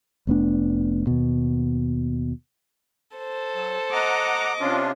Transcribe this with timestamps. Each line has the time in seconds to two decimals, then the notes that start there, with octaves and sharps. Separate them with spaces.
0.27 F1 A3 B3 D4
1.07 D#2 B2
3.17 A4 C5
3.54 F#3
3.92 D#5 F#5 A#5 D6
4.61 C3 C#4 D4 F4